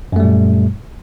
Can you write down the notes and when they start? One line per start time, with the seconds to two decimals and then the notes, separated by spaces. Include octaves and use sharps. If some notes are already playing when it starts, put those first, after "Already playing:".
0.12 F#2
0.16 A3
0.20 G3
0.24 A#2